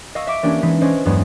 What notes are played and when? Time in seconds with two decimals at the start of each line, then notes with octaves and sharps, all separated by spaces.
0.15 D#5 F5 C#6 E6
0.27 E5 D6 D7
0.43 E3 A#3 C#4 D4 G4
0.62 E3 G#3 D#4 B6
0.81 C#4 D4 C5 D#5
1.05 E2 G2 F#3 G#3 B3 C#4